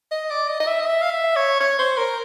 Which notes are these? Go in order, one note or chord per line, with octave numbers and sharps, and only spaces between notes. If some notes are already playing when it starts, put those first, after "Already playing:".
D#5
D5
D#5
D#5
E5
D#5
E5
F5
E5
C#5
C#5
C5
A#4